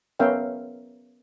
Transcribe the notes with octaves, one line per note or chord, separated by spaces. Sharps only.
B3 C#4 A#4 E5 F5 G5